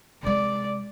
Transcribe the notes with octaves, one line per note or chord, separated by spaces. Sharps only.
C3 G#3 D5